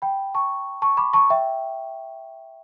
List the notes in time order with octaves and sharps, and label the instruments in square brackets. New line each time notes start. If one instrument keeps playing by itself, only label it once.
[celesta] G5 B5
A5 C#6
A5 C#6
B5 D6
A5 C#6
E5 G5